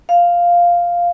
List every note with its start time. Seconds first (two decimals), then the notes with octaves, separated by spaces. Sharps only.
0.09 F5